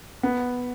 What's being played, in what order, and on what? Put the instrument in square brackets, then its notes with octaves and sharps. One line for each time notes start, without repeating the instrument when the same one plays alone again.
[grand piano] B3